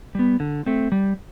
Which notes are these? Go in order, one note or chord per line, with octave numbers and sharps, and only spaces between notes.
G3 B3
D3
A3 C4
G3